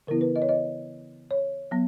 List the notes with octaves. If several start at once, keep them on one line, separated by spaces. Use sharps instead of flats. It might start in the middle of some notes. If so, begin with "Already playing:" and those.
C#3 E3 B3 E4 A#4
B4
D#5
C#5
D#5
C#5
F#3 B3